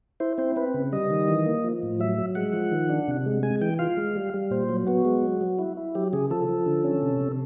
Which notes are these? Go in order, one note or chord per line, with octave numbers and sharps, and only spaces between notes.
E4 C5
C4 C5
C4 B4
C#3
G3 D#5
D#3
E3
A#3
F3
A2
F#3 E5
F#3
G#3 F#5
F3
D#3
D4
C3
G#3
G#3 G#5
E3 G5
F4 F5
G#3
G3
G3
A#2 C5
F#3
B3 F#4
G#3
F#3
F#3
E4
E4
F#3 G4
C#3 G#4
F3 A4
F3
D3
C#4
C3
C3